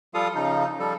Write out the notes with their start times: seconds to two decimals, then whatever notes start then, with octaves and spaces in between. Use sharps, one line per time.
0.14 F3 G3 F4 A4 F5 D#6
0.35 C#3 F3 D#4
0.79 F3 G3 A4